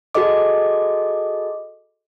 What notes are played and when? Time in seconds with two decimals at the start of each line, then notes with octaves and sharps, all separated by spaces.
0.15 F#4 G#4 A4 D#5 D6